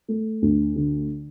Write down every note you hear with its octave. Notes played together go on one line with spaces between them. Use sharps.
A3
D2
D3